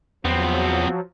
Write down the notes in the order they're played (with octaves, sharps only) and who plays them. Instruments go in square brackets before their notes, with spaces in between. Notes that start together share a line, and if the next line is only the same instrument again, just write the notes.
[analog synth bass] E2 [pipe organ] F3 F#3 [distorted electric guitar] B3 C4